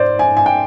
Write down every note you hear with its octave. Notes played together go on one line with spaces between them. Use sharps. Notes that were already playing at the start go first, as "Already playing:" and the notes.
Already playing: G#2 C5 D5
G#5
G#5
G5